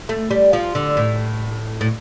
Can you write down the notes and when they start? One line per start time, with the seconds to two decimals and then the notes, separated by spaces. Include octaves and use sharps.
0.09 A3
0.31 G3
0.53 F3
0.75 D3
0.97 A2
1.81 A2